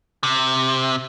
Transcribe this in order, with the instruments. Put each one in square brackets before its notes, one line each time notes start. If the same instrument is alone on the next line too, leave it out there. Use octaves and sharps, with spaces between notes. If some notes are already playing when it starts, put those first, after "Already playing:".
[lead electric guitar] C3